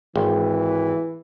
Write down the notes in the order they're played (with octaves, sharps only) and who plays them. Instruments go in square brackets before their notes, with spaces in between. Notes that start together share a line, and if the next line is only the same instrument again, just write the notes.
[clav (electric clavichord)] G#1 [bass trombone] E3